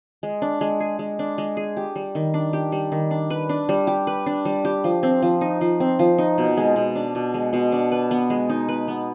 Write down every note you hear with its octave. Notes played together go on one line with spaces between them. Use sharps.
G#3
D4
G#3
G#4
G#3
D4
G#3
G#4
G4
G3
D#3
D4
G4
G3
D#3
D4
B4
D4
G3
G4
B4
D4
G3
G4
F3
C4
F3
D#4
F3
C4
F3
D#4
B2
G#3
B2
D4
B2
G#3
B2
D4
B4
B3
G#3
D#4
B4
B3